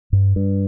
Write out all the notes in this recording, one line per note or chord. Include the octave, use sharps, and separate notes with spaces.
G2
G2